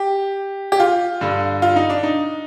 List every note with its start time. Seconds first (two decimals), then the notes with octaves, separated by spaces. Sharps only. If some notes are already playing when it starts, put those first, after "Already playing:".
Already playing: G4
0.72 G4
0.80 F4
1.21 G2 D3
1.62 F4
1.76 D#4
1.90 D4
2.03 D#4